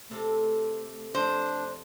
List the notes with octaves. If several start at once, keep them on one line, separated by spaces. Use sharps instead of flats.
C3 A3 A4
F2 D4 C5